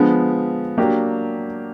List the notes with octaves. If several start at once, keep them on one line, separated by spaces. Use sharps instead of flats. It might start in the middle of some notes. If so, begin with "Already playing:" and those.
Already playing: D3 F3 G#3 B3
F#3 A#3 D4 G4